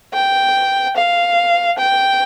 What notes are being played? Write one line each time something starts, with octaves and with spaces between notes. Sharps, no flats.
G5
F5
G5